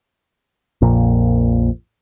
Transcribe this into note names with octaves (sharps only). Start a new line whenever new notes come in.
A#1 F2 A#2